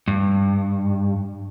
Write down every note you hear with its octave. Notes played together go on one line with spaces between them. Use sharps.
G2